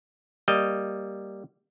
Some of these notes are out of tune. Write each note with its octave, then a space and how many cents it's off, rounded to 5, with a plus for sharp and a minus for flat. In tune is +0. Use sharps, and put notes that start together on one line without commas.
G3 +0 A#3 +0 D#5 +0